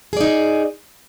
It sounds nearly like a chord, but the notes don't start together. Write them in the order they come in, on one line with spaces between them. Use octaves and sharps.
G#4 D5 D#4